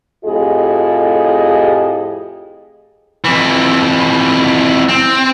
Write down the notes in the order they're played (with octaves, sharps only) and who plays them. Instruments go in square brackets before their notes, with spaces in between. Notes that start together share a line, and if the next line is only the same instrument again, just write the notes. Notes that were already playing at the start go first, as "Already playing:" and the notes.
[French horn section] F2 A2 F4 G4 G#4 D#5
[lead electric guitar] F2 E3
C4